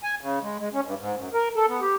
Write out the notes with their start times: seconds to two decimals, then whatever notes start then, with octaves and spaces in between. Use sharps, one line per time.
0.03 G#5
0.21 C#3
0.42 G#3
0.59 G#3
0.73 C#4
0.85 G2
0.99 G#2
1.16 F#2
1.34 A#4
1.56 A4
1.69 B3
1.81 G4